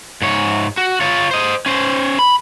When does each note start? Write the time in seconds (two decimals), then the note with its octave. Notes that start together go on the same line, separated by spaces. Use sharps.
0.22 G#2 C#5
0.77 F#4
1.01 F4 C#5
1.31 C5 D#5
1.66 C#4 C5
2.19 B5